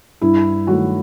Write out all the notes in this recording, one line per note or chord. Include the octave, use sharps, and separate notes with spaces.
G2 E4
D#3 F#3 A3 F#4